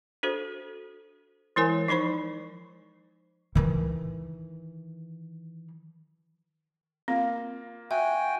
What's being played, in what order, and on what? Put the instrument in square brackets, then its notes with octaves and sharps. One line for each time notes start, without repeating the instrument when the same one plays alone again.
[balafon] D4 F#4 A4 C5
E3 G#3 E4 A#4 C#5 G#5
F3 D#4 C5 B5 C#6
[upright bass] D#3 E3
[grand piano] A#3 F4 [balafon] C4
[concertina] F#4 G5 G#5 [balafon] E5